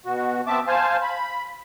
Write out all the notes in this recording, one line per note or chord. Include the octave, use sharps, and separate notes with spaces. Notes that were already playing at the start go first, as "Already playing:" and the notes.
B2 F#4
B3 C4 E5 A5 D6
C5 F5 G#5 A5
B5